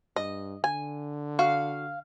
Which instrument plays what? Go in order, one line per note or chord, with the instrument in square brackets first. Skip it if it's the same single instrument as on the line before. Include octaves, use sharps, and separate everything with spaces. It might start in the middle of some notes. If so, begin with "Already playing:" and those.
[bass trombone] G2 [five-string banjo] D#5
[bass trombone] D3 [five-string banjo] G#5
[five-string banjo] F#4 [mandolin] F5